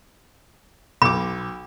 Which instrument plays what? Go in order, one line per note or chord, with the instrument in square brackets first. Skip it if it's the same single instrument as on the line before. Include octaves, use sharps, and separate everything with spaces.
[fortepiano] B1 D6 [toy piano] B5